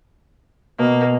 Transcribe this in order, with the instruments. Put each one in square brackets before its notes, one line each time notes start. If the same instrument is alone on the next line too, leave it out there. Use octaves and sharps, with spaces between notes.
[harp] B2 [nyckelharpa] A#3